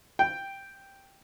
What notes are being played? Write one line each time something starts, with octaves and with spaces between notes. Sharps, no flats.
G5